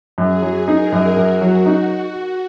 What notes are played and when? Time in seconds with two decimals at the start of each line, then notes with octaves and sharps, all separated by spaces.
0.18 F#2 G#4
0.42 F#3
0.67 D#4 A#4
0.92 F#2
1.17 F#2 F#4
1.41 F#3
1.66 D#4